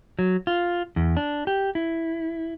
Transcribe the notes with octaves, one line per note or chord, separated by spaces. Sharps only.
F#3
F4
E2
D4
G4
E4